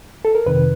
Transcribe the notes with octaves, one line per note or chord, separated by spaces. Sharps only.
A4
A#4
F2 C3 D#3 B4